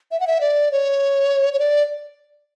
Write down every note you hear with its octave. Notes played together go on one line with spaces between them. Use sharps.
E5
F#5
E5
D5
C#5
C#5
D5